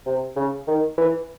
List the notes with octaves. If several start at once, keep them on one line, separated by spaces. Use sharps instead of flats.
C3
C#3
D#3
E3